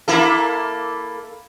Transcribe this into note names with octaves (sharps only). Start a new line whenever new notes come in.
A#3 E4 A4